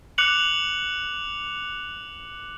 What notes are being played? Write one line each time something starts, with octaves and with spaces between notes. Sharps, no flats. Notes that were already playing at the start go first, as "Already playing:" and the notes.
D6 F#6 C#7 F7 F#7